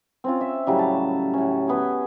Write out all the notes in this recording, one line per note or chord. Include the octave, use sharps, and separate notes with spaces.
C4 C#4 F4
E5
A2 C#3 F#3 G3
A5
A2 C#4
B3 G#4